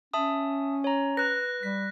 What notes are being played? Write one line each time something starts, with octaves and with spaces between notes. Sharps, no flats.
C#4 E5 A5 D#6
C#5 A#5
B4 F#6 A#6
G3 B6